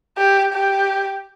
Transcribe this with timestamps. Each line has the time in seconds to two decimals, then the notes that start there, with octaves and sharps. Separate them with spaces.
0.17 G4
0.53 G4